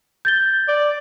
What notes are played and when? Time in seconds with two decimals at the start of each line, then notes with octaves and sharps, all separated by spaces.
0.25 G6 A6 G7
0.68 D5